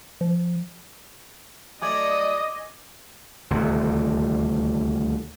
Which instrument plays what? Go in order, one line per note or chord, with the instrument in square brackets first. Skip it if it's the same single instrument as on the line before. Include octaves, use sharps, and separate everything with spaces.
[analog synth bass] F3
[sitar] F#3 A3 D5 [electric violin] D#5 [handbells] G#5 D6 G#6 [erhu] D#6
[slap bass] D#1 D2 C3